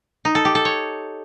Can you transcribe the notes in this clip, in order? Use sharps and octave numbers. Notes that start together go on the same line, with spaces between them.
D#4
A4
G4
A4
C#5